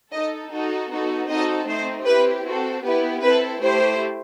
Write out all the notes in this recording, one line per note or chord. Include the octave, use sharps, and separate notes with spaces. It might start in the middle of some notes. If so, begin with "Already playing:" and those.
D#4 A4 D#5
D#4 F#4 A4
B3 D#4 F#4 A4
C4 D#4 F#4 A4 D#5
A3 C4 D#4 C5
C4 E4 G4 B4
C4 F#4 A4
B3 E4 G4 B4
C4 E4 A4 B4
A3 E4 G4 C5